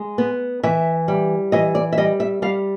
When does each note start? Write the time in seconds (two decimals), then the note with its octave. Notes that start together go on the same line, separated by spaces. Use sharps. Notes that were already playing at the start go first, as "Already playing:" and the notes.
Already playing: G#3
0.18 B3
0.63 E3 E5
1.08 G3
1.52 E3 D#5
1.75 D5
1.92 E5
1.98 G3 D#5
2.20 E5
2.42 G3 F5